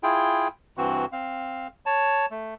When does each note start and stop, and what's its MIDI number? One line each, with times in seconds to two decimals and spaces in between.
0.03 0.48 64
0.03 0.48 65
0.03 0.48 68
0.03 0.48 79
0.77 1.05 43
0.77 1.05 52
0.77 1.05 60
0.77 1.05 66
1.12 1.67 60
1.12 1.67 77
1.86 2.26 73
1.86 2.26 81
2.31 2.54 57